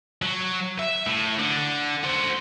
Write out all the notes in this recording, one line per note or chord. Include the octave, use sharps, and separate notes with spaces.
F#3
E5
A2
D3
F#4 C5